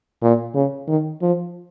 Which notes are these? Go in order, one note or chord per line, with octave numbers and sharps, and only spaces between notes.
A#2
C#3
D#3
F3